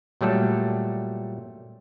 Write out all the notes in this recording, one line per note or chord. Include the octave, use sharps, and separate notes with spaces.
A#2 F#3 G3 A3 A4